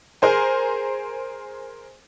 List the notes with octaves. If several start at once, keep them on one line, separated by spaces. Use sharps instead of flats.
G#4 A#4 C5 G#5